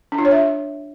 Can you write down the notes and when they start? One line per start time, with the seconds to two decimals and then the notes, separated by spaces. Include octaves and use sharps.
0.12 D4
0.18 F4
0.25 C#5
0.31 E5